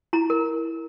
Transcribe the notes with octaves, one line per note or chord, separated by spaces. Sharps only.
E4 A#5
A#4